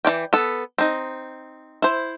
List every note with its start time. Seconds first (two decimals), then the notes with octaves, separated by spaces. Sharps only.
0.05 E3 F4 D5 G5
0.33 B3 A4
0.78 C4 D#4
1.82 E4 C5